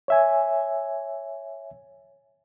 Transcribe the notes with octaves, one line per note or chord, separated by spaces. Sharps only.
C#5 E5 G#5